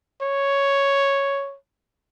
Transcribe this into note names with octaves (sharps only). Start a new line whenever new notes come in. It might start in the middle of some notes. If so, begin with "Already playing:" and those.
C#5